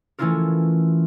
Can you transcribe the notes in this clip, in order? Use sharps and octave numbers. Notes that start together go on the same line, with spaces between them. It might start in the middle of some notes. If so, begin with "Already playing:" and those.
E3 A3 C#4 E4 F4 A#4